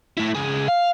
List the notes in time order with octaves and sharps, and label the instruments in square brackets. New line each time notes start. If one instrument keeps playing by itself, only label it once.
[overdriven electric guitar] A3 E4
C#2 G#4
F5